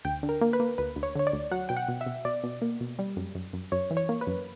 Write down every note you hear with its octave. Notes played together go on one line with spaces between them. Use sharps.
D2 G5
D3
A#4
A#3
B4
A#3
D2 B4
D2
C#5
D3 C#5
D5
D2
F#3 F#5
B2 G5
F#5
B2
E5
B2
B2 D5
B2
A#3
B2
G3
F#2
F#2
F#2
F#2 C#5
E3
C#5
A#3
B4
F#2